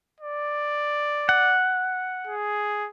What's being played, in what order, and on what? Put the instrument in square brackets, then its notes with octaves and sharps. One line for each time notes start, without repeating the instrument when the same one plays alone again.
[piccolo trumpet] D5
[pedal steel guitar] F#5
[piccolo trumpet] G#4